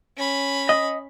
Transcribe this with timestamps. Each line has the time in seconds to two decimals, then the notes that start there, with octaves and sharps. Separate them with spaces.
0.17 C#4 B5
0.69 D#5